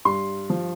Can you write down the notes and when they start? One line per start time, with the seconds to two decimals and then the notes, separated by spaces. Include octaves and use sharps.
0.05 G2 C6
0.50 F3